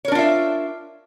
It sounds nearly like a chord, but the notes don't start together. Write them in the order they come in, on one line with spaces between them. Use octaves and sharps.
C#5 A#4 D4 F4 E5